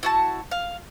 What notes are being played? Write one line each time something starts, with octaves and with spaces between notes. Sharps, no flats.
E4 F#4 A5
F5